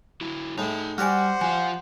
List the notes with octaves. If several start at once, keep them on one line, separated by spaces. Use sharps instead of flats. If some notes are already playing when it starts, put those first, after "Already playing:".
F#3 E4
A2 G#3 D#4 E5
G3 F#4 G4 C5 D5 F#5 G#5 F6
F3 F4 F5 G#5